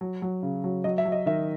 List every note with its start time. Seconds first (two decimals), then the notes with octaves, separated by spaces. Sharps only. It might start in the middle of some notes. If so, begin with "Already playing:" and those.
0.01 F#3
0.22 F#3
0.43 C#3
0.64 F#3
0.84 F#3 D#5
0.98 E5
1.05 F#3
1.12 D#5
1.26 D#3 E5